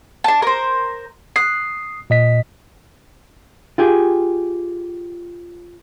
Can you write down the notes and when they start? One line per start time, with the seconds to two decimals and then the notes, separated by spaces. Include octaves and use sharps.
0.24 D4 A5
0.42 A#4 C5
1.36 D#6 F#6 C7
2.10 A#2 D#5 B6
3.78 F4 G4 G#4